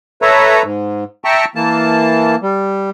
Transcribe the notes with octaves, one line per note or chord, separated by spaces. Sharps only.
A4 B4 C#5 E5 A#5
G#2
E5 G5 A5 A#5 C#6
E3 A#3 A5
G3